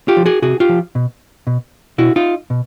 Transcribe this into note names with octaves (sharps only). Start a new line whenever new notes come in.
F4 G4
F3
F#4 G#4
C3 F#4 G#4
F4 G4
F3
B2
B2
B2 E4 F#4
D#4 F4
B2